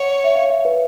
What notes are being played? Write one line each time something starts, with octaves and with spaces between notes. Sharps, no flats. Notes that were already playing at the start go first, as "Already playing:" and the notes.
Already playing: C#5 F#5
E5
F5
E5
B4